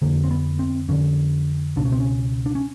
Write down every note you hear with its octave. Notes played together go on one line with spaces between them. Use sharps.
F2 D3 A#3
C4
B3
C4
F2 D3 C#4
C#2 B2 D4
C#4
C4
C#4
D4
C#4